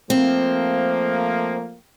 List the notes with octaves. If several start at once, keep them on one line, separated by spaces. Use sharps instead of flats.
F3 A3 A#3 C4